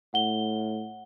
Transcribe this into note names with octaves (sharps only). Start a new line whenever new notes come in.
A2 F#5 G7